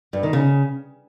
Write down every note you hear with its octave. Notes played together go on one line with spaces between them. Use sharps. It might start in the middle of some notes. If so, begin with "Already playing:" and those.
G2
D#3
C#3